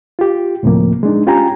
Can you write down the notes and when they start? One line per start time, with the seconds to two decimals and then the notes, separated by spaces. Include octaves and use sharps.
0.19 F4 G4
0.63 D2 A2 C3 F3 A#3
1.03 G#3 D4 D#4
1.27 C#4 F4 G4 G5 G#5 A#5